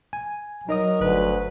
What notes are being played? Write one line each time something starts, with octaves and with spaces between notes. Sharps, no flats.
G#5
F#3 D#4 A#4 D#5 D#6
G1 D2 B4